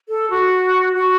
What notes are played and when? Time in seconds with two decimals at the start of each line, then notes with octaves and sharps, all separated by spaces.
0.09 A4
0.30 F#4
0.95 F#4